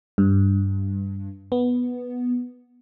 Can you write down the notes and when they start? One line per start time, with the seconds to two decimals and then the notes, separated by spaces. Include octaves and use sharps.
0.18 G2
1.52 B3